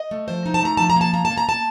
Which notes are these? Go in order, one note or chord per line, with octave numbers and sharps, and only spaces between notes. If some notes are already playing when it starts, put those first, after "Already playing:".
Already playing: D#5
A3
F3 C5
D#4
A5
A3 A#5
F3 A5
A#5
A#3 A5
A#3 A#5
A5
A#3
A#5
A#3 A5